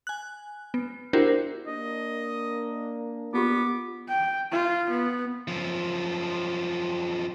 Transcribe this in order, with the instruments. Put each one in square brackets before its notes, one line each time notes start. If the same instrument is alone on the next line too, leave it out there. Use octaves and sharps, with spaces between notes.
[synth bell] G#5 F#6
B3
D4 E4 F#4 G4 A#4 C5
[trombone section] A#3 D4 [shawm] D#5
[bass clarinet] B3 [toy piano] E4 F4 G4 [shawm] D6
[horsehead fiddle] G5
F4
B3
[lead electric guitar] F#2 F3